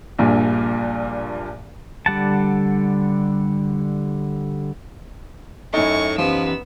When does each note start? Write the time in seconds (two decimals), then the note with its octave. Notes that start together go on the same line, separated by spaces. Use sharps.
0.19 A#1 G2 A#2
2.06 D3 G3 F#5 A5
5.74 F#2 A2 D#4 D#5 G#5 C#6
6.18 E3 F3 B3 C#4 G4 E6